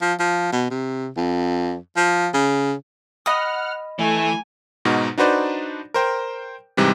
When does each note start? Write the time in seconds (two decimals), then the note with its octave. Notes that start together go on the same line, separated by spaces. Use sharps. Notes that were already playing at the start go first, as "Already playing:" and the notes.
0.02 F3
0.20 F3
0.52 B2
0.71 C3
1.17 F2
1.97 F3
2.34 C#3
3.26 D#5 F#5 B5 D#6 F6
3.99 E3 A3 G#5
4.85 G#2 B2 D#4 F#4
5.18 D4 D#4 F#4 B4 C5 D5
5.94 A#4 C5 G5
6.77 G#2 C3 E3 G3